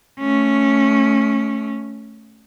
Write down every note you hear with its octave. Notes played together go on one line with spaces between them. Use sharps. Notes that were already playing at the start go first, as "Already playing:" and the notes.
A3 C#4